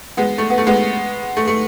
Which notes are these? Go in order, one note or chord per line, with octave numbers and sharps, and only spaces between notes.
G#3 B3
A3
B3
A3
G#3 B3
A3
A3